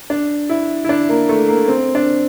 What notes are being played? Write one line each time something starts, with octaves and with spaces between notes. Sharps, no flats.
D4
E4
E4
D4
A#3
A3
A#3
C4
D4